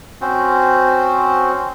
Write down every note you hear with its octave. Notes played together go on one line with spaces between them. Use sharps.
C4 C#4 F#4 C5